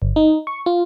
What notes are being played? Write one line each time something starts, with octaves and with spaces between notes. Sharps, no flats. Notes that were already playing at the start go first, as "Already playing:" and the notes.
G1
D#4
C#6
F4